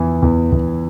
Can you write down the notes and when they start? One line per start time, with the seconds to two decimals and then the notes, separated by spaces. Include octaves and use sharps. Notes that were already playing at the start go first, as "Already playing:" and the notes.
Already playing: E2 E3
0.22 E2
0.52 E2